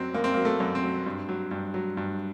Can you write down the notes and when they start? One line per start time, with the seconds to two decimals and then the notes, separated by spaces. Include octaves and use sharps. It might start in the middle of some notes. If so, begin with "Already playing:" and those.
Already playing: F#2 F#3 C4
0.14 F#2 A#3
0.24 C4
0.34 F#3 A#3
0.45 A3
0.60 F#2
0.75 C4
0.83 F#3
1.06 G2
1.29 F#3
1.51 G2
1.74 F#3
1.97 G2